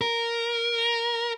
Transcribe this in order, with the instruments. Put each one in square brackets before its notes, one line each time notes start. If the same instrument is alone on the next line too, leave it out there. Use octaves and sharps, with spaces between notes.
[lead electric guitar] A#4